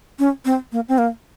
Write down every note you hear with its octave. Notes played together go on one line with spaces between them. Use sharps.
C#4
C4
A#3
C4
A#3